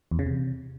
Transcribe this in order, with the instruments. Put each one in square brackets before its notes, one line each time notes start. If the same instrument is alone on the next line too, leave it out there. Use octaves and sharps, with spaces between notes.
[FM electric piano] E2
C#3
C3